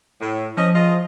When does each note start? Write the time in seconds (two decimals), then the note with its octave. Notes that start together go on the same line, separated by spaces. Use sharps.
0.21 A2
0.57 F3 C#4 D#5
0.75 F4 G#4 D#5